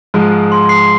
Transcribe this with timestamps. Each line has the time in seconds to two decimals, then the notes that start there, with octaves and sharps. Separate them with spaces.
0.14 G#2 F3 G#3
0.52 C6
0.69 C7